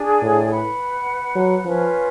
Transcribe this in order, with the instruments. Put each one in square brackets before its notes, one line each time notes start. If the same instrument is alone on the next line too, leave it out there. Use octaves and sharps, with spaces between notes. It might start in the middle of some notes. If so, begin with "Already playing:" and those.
Already playing: [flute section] D4 G#4 D5 G#5
[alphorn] A2
[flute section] B4 F#5 B5
[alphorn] F#3
[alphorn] F3 [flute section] C#4 F4 B4